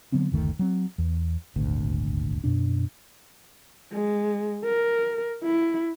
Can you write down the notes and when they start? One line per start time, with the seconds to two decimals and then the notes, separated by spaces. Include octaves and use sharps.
0.12 D3 F#3 B3 C4
0.32 F#1 D2 D#3 A3
0.59 F#3 C4
0.98 E2
1.56 D#1 G#1 D2
2.44 F#2 B2 D4
3.92 G#3
4.65 A#4
5.43 E4